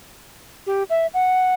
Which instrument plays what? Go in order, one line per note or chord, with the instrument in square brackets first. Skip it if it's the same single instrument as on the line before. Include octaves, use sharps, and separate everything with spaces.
[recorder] G4
E5
F#5